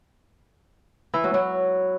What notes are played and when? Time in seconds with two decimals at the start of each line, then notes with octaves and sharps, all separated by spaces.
1.14 E3
1.24 F#3
1.34 F#3